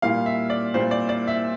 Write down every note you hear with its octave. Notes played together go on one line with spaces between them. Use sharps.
A#2 G3 A#3 F5
E5
D5
A#2 G3 A#3 C5
D5
D5
E5